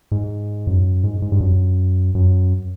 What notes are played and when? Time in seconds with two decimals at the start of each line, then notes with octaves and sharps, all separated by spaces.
0.12 G#2
0.67 F#2
1.04 G#2
1.22 G#2
1.32 G2
1.40 F#2
2.15 F#2